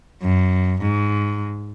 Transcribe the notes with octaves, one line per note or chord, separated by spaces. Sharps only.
F#2
G#2